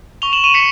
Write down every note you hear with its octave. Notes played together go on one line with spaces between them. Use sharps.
C#6 F7 G7
E7 F#7
C#6 D#7 F7
B6 C#7